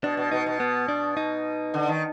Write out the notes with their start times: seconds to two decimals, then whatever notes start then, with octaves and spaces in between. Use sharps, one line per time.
0.04 B2 D4
0.17 B2
0.31 B2 D#4
0.46 B2
0.60 B3
0.88 D4
1.17 D#4
1.74 D3
1.88 D#3